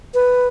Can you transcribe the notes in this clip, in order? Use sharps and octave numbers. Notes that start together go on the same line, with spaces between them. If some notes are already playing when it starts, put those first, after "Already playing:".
B4